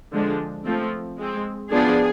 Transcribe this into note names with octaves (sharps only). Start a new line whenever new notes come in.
D3 F3 G#3 D4
F3 A3 C4
G#3 C4
F3 B3 D4 G#4